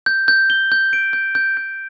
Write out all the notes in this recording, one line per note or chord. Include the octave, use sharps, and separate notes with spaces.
G6
G6
G7
G6
D7
G6
G6
G6